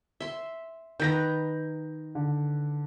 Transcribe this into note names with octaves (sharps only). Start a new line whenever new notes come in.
E5 C6
D#3 B4 A#5 G6 A#6
D3